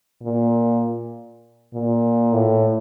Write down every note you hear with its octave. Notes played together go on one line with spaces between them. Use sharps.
A#2
A#2
A2